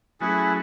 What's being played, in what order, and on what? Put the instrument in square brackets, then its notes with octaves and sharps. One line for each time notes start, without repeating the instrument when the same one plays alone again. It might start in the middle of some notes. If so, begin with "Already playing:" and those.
[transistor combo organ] F#3 A3 C#4 F#4 B4 [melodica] E4 G#4